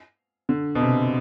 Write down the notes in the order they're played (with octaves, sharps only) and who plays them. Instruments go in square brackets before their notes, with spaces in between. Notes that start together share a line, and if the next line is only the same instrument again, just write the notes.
[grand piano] D3
B2
C3